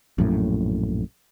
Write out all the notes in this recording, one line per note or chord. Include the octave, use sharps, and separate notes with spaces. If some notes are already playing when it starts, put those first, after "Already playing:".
A#1 F#2 A2